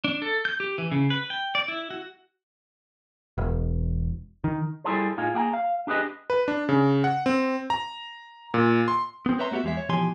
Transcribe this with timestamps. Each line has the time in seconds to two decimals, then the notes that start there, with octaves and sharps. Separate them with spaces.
0.04 D4
0.22 A4
0.45 G6
0.60 G4
0.78 E3
0.91 C#3
1.10 B4
1.30 G5
1.55 D5
1.68 E4
1.91 F#4
3.38 E1
4.44 D#3
4.84 G3 E4 G#4 A4 C5
5.17 A2 D#4 F4 G#4
5.34 A#3 G#4 G5 A#5
5.53 F5
5.87 D4 G4 G#4 B4 D#5
6.30 B4
6.48 D4
6.69 C#3
7.04 F#5
7.26 C4
7.70 A#5
8.54 A#2
8.88 C6
9.26 B3 C4
9.39 B4 C#5 E5 A#5 C6
9.51 A3 B3 F#4 G4 E5
9.64 E2 G#3 E5
9.77 C#5
9.89 B2 E3 F3 G4 G#5 C6